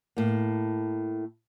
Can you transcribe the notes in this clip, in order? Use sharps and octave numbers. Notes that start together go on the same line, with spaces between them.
A2 A#3